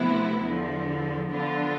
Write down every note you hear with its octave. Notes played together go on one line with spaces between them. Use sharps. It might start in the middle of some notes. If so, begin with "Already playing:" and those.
Already playing: D2 C3 F3 B3 E4
E2 D3 F3
D3 F3 B3 D4 F4